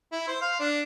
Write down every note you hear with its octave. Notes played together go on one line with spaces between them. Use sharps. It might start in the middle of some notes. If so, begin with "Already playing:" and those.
E4
C5
F5
D4